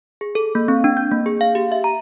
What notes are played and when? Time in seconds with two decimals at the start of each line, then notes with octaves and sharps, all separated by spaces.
0.21 G#4
0.35 A4
0.55 A#3
0.68 C4
0.84 D4
0.97 G6
1.12 A#3
1.26 G#4
1.41 F5
1.55 G4
1.72 E5
1.84 A#5